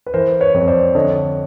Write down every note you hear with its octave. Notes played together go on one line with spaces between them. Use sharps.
B4
E3 A#4 C5
B4 C#5
F2
C5 D5
D3 C#5 D#5